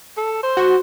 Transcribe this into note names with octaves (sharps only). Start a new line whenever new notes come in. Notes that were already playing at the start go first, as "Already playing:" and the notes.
A4
C5
F#4